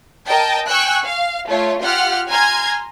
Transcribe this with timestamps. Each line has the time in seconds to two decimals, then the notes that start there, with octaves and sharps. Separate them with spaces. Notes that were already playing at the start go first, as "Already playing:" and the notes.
0.25 A#4 D#5 G5 A5
0.69 G5 G#5 C#6 E6 F#6
1.04 F5
1.47 A3 F4 C#5
1.80 F4 G4 F#5 F6
2.29 G#5 A#5 C6 F6 G#6